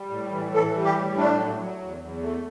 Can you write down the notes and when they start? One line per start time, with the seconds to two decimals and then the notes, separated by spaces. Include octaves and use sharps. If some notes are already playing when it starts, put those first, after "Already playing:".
Already playing: G3
0.10 A2
0.31 E3
0.52 E3 A4
0.73 G3
0.84 G4
0.95 A2
1.17 A3 D4
1.37 F#3
1.59 F#3
1.80 E2
2.01 E2
2.22 A3